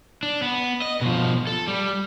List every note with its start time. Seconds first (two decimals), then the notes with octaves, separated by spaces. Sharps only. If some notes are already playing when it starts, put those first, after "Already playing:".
0.23 D4
0.42 B3
0.82 D#5
1.01 B2 F3
1.47 A4
1.68 G3